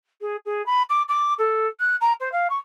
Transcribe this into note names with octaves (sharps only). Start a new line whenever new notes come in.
G#4
G#4
B5
D6
D6
A4
F#6
A#5
C5
F5
C#6